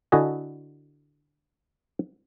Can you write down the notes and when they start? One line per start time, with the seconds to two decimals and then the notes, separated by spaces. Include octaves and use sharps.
0.12 D3 E4 F#4 A4 D#5 G#5